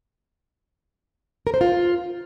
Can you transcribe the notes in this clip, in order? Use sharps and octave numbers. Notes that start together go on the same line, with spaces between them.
A#4
C5
F4